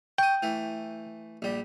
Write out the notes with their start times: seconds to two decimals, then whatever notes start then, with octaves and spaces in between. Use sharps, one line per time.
0.18 G5 C#6 D#6
0.42 E3 A3
1.42 A#1 G3